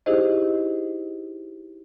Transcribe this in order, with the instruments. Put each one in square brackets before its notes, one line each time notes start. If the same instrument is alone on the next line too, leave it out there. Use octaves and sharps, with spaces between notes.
[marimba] D#4 E4 G4 G#4 C5 D#5